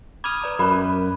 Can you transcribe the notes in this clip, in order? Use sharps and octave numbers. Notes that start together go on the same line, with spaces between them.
B5 D6 D#6 F6 G#6
B4 D5 A#5
F#2 A#4 B4 D5 D6